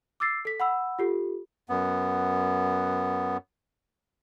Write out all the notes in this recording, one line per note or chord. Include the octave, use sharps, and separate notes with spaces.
D6 E6 A6 C7
A4 B6
F#5 B5 E6
F4 G4 A4
F#2 B3